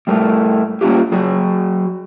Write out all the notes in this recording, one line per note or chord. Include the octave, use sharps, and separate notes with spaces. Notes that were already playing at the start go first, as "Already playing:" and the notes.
A2 G3 A3 A#4
G3 A#3 C#4 F4 G4
F#3 F#4 G#4